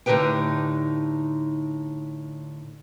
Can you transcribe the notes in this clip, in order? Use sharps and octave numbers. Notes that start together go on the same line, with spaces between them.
A2 D3 D#4 G4 B4 G5